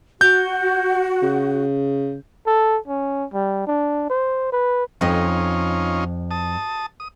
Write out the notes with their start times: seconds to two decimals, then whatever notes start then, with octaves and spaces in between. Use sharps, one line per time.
0.21 F#4 G6
1.23 C#3
2.47 A4
2.88 C#4
3.34 G3
3.67 D4
4.10 C5
4.52 B4
5.01 F2 C#4 D#4 F4 D#5
6.31 A5 D#6
7.00 D#6